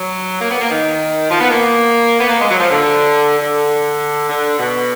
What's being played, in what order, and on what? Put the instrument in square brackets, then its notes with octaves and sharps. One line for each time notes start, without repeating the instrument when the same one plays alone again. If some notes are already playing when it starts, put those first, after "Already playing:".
Already playing: [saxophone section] F#3
A#3
B3
A#3
D#3
F3
B3
A#3
B3
A#3
G#3
F#3
F3
D3
D3
D3
B2